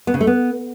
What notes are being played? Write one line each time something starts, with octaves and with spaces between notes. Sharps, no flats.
B3
C#3
A3
B3